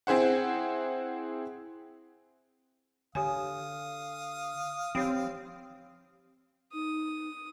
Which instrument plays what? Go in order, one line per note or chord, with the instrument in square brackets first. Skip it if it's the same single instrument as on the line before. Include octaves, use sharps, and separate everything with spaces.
[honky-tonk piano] C4 E4 G#4 C5 F#5
[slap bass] D3 [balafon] G4 C#5 G#5 [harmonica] F5 D#6
[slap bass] F3 [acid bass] C4 [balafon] D#4 G4 C#5
[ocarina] D#4 [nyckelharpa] D#6